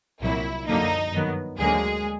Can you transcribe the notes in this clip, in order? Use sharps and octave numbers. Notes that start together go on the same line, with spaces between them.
C2 A#2 F#3 E4
F#2 D3 F3 A#3 D#4
G2 D#3 F#3 B3
D2 D3 F#3 G#3 A#3 G#4